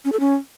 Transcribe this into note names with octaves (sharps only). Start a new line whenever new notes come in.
C#4
A4
C#4